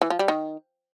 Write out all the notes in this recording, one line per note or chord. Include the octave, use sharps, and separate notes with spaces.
E3
F3
G3
D#3